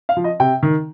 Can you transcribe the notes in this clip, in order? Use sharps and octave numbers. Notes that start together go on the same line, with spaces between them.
F5
F3
D#5
C3 G5
D#3